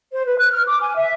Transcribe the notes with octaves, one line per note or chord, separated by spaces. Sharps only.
C5
B4
F#6
F6
D6
G#5
E5